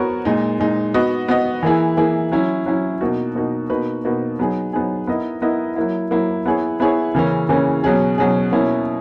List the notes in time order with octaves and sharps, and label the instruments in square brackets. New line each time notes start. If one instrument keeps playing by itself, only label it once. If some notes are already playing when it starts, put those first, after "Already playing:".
Already playing: [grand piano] B3 F#4 A#4 C#5
A#2 G#3 D#4
A#2 G#3 D#4
B3 F#4 B4 D#5
B3 F#4 B4 D#5
E3 A#3 E4 G#4
E3 A#3 E4 G#4
F#3 C#4 E4
F#3 C#4 E4
B2 A#3 D#4 F#4
B2 A#3 D#4 F#4
B2 A#3 D#4 F#4 B4
B2 A#3 D#4 F#4 B4
F#3 B3 D#4 G#4
F#3 B3 D#4 G#4
B3 E4 A#4 D#5
B3 E4 A#4 D#5
F#3 A#3 E4
F#3 A#3 E4
B3 E4 G#4 C#5
B3 E4 G#4 C#5
C#3 E3 A#3 C#4
C#3 E3 A#3 C#4
B2 F#3 C#4 G#4
B2 F#3 C#4 G#4
B2 A#3 C#4 E4